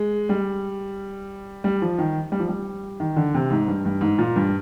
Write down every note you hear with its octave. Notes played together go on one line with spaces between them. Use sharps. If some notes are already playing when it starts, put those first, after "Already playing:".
Already playing: G#3
G3
G3
F3
D#3
G3
F3
G3
D#3
D3
C3
G#2
G2
G2
G#2
A#2
G2